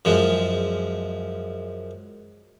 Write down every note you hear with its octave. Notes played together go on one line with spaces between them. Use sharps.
F#2 F3 G#3